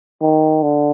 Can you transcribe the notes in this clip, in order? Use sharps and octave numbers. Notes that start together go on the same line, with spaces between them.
D#3
D3